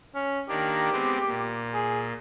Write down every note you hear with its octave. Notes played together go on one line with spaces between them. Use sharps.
C#4
D#3 A#3 D4 G4
G#3 B3 C4
A#2
G#4